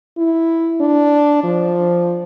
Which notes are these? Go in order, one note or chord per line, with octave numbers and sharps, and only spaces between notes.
E4
D4
F3